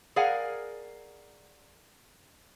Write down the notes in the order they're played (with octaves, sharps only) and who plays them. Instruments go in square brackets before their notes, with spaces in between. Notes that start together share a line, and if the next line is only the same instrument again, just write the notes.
[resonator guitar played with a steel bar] G#4 A#4 D5 F5 F#5 G#5